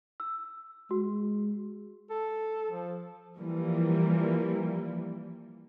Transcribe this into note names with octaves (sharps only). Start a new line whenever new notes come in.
E6
G#3 F#4
A4
F3
E3 F3 G3 A#3